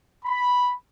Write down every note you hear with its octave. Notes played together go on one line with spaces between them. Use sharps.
B5